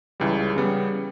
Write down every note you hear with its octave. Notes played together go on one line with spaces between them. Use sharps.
C#2 C#3 E3 G3
C#3 G3 B3